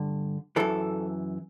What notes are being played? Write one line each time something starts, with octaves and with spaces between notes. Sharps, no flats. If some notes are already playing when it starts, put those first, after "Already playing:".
Already playing: G2 D3
F#2 E3 A4